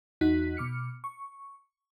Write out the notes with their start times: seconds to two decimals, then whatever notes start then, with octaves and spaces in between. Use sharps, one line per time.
0.21 E2 D#4 F#4 F#6 B6
0.57 B2 D6 F6 C#7
1.04 C#6